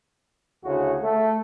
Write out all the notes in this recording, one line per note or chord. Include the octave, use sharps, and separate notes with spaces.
D2 C#3 E4 F#4
A3